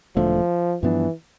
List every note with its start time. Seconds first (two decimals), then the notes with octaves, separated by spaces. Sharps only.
0.16 E1 E2 D3 F3 A3
0.83 G2 E3 F3 B3 D4